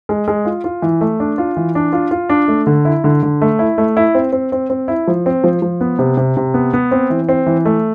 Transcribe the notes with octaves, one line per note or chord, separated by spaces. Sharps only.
G#3
G#3
F4
F4
E3
A3
D4
F4
E3
D4
F4
F4
D4
A3
D3
E4
D3
D3
A3
E4
A3
E4
C4
C4
C4
C4
E4
F3
C4
F3
F3
B3
C3
C3
C3
B3
B3
C4
E3
C4
E3
A3